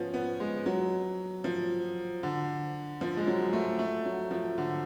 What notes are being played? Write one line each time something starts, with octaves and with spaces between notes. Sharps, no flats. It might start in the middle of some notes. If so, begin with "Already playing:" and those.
Already playing: F3 B3 C#4
B3
G#3
F#3
F3
D3
F3
G#3
F#3
A3
A3
F#3
F3
D3